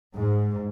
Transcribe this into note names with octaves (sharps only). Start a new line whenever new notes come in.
G#2